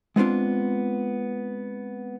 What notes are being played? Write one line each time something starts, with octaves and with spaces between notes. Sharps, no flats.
G#3 B3 C4 D4 F4